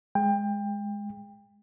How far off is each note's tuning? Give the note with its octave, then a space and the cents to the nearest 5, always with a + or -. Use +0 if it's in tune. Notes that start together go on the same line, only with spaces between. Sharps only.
G#3 +0 G5 +25